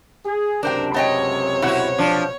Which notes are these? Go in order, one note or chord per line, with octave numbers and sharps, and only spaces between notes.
G#4
C#2 F#2 C3 D4 A#4 C5 G5
B3 C#5 D#5 G5
B2 E4 F#4 C5 F#5
F3 D4